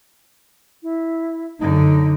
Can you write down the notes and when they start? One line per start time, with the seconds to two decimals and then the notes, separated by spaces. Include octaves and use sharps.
0.83 E4
1.59 F#2 D3 D#4